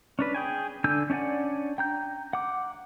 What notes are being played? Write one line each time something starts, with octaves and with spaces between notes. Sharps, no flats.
C#4 D4 B4
G#4 G5 G#5
D3 D4 G#5 E6 G6
C#4 D4 D5 F#5 G#5
G5 A#5 G6
F#5 D6